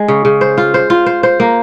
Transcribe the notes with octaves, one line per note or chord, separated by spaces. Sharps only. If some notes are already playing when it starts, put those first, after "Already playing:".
Already playing: G#3
C#3
C#3
C5
F4
C5
F4
C5
C5
A#3